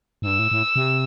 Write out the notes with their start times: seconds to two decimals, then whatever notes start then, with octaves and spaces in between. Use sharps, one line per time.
0.22 G#2
0.26 G2 E6
0.39 A2
0.52 A2
0.76 C3